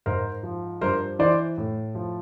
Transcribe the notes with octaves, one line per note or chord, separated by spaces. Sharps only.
G#2 A#4 C5
F3
G2 A#4 C5
E3 C5 D5
A2
F3